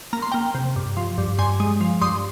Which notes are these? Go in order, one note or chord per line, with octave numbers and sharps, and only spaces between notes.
A#3 A#5
C6
A#3 G5 A#5
C3
G2
F3
G2
G2 G#5 C6
G#3
F3
G2 C6 D#6